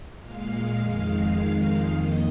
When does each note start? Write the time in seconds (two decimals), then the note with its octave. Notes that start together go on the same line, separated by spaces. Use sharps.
0.19 A#2 G#3 F5
0.79 F2 D#3 G#3
1.38 F2 D#3 G#3
1.97 F2 D#3 A#3 D#5